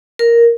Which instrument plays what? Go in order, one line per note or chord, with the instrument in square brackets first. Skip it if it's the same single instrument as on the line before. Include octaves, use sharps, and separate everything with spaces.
[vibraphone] A#4